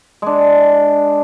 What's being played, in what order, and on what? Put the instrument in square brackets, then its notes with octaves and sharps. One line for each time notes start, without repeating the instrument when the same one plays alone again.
[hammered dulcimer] G#3 D4